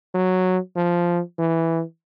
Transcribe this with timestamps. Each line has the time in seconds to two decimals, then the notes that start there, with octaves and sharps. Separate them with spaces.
0.14 F#3
0.76 F3
1.38 E3